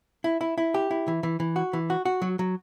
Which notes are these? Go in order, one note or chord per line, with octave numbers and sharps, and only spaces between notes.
E4
E4
E4
G4
E4
E3
E3
E3
F#4
E3
F#4
F#4
F#3
F#3